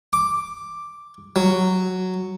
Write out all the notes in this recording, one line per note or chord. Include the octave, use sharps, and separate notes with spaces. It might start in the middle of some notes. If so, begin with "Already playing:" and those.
D6
F#3